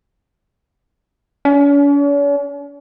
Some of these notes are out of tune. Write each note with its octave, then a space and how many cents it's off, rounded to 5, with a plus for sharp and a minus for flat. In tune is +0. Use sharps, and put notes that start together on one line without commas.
C#4 +45